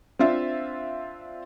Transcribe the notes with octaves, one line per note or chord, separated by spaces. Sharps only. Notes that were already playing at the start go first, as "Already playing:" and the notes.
C4 D4 F4 E5